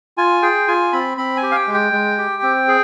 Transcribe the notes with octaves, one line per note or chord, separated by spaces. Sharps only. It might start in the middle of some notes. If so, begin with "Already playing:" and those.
F4 G#5
G#4 G5
F4 G#5
C4 B5
C4 B5
G#5
G4
F5
G5
G#3
G5
G#3
G4
C4
G#4